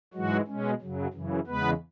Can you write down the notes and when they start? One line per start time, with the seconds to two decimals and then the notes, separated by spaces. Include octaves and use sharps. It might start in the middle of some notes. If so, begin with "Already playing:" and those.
0.14 G#2 E3 F#3 G#3 F#4
0.48 B2 G#3 C#4
0.81 F#2 C#3 F#3
1.13 F#2 C#3 E3
1.47 E2 C#3 G#3 B3 B4